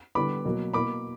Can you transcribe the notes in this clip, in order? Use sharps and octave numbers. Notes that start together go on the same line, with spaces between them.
D3 G3 B3 B5 D6
B2 F#3 A#3
B2 A#3 B5 D6